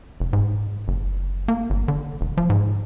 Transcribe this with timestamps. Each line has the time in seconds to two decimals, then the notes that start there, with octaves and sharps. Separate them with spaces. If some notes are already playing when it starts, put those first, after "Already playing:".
0.20 F1
0.33 G#2
0.88 F#1
1.48 A#3
1.70 G1
1.88 D3
2.21 E1
2.37 F3
2.50 G#2